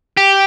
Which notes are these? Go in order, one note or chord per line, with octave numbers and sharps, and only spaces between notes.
G4